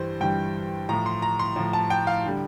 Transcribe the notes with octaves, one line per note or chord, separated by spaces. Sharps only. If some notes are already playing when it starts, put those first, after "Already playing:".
Already playing: G2 E3 G3 C5
G2 E3 G3 G5
A2 F3 A#5
C6
A#5
C6
A2 F3
A5
G5
F5
D3 G3